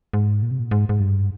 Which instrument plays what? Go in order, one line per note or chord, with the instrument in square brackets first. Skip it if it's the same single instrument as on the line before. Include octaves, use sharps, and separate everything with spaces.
[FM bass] G#2
A#2
C3
A#2
G#2
G#2
G2